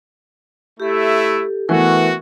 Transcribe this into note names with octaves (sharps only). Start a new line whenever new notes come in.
A3 E4 G4 A4
E3 A3 B3 F#4 A#4